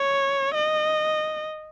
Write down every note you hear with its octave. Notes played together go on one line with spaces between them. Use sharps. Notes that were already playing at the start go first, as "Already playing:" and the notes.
Already playing: C#5
D#5